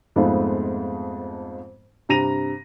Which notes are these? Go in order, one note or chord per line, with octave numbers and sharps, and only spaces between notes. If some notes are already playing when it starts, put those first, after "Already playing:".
F2 G#2 G#3 A3 B3 F4
G2 C3 A#5 A#6 D#7 F7